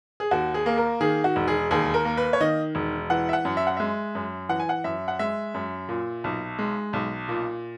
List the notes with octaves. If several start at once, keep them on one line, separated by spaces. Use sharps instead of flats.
G#4
D#2 F#4
G#4
A#3
A#4
D#3 G#4
F#4
E1
G#4
D#2 G#4
A#4
A#3
B4
C#5
D#3 D#5
E1
E3 F#5
E5
F#5
F#2
E5
F#5
G#3 E5
F#2
E3 F#5
G#5
F#5
F#2 E5
F#5
G#3 E5
F#2
A#2
B1
G#3
B1
A#2